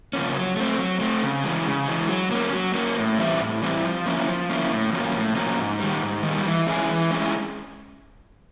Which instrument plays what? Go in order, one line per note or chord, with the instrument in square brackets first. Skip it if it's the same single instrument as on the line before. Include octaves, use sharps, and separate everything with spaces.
[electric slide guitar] C#3 F3 A#3 C#4
F#3
A3 C4
F#3
A3 C4
C#3
E3 G#3
C#3
E3 G#3
F#3
A#3 C#4
F#3
A#3 C#4
A2
E3 G3 C4 E4
A2
E3 G3 C4 E4
F3
A#3 C#4 E4
F3
A#3 C#4 E4
A2
F3 A#3 C#4 F#4
A2
F3 A#3 C#4 F#4
G#2
D#3 G3
G#2
D#3
G3
E3
G#3 C#4 E4 G#4
E3
G#3 C#4 E4 G#4